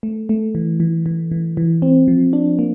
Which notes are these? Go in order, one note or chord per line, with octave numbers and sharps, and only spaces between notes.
A3
A3
E3
E3
E3
E3
E3
C4
F3
D4
A#3